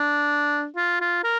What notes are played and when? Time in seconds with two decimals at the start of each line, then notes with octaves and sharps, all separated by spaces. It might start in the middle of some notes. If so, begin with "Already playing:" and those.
Already playing: D4
0.76 F4
1.01 F4
1.24 A#4